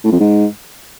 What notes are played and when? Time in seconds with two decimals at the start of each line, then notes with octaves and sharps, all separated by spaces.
0.04 A2
0.12 F2
0.20 G#2